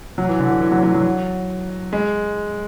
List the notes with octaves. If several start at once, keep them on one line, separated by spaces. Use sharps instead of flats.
F#3
E3
D3
E3
E3
F#3
F#3
F#3
G#3